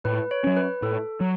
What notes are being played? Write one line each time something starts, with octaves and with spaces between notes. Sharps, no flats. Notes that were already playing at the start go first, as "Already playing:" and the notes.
A2 B4
C#5
F#3 C#4
B4
A2 A4
F#3